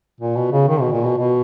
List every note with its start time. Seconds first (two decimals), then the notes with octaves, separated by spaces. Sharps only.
0.20 A#2
0.37 B2
0.52 C#3
0.68 D#3
0.81 B2
0.93 A#2
1.05 B2
1.18 B2